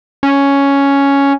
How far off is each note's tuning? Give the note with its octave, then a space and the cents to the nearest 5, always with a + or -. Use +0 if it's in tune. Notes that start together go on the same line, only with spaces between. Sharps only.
C#4 +5